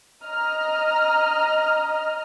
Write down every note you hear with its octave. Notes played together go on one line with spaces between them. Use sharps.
D#5 A#5 F6